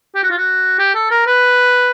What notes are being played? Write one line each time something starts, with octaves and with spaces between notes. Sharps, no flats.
G4
F#4
F4
F#4
G4
A4
A#4
B4